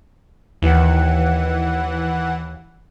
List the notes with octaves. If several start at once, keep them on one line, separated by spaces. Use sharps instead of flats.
D#2 E3 F#5